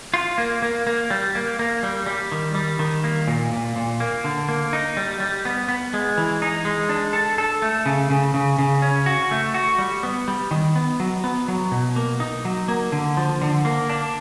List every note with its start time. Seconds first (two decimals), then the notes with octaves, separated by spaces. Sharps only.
0.14 F4
0.38 A#3
0.62 A#3
0.87 A#3
1.10 G3
1.35 A#3
1.59 A#3
1.83 G3
2.06 G3
2.32 D#3
2.55 G3
2.79 D#3
3.04 A#3
3.28 A#2
3.52 A#2
3.76 A#2
4.00 A#3
4.24 D3
4.48 A#3
4.73 D#4
4.97 G3
5.20 G3
5.45 B3
5.68 B3
5.94 G#3
6.18 E3
6.42 D#4
6.65 G#3
6.89 D4
7.13 A4
7.38 A4
7.62 A3
7.86 C#3
8.10 C#3
8.34 C#3
8.59 C#3
8.82 C#4
9.06 F#4
9.31 A3
9.54 F#4
9.79 G3
10.03 B3
10.28 G3
10.51 D#3
10.76 B3
11.00 F#3
11.24 B3
11.48 F#3
11.72 B2
11.96 A#3
12.20 D#4
12.45 F#3
12.68 A#3
12.92 D3
13.17 F3
13.42 D3
13.65 A#3
13.89 D4